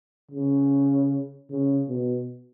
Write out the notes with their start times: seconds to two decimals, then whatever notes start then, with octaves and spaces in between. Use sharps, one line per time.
0.32 C#3
1.50 C#3
1.89 B2